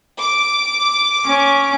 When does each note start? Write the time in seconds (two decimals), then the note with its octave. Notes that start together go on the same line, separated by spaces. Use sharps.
0.20 D6
1.25 C#4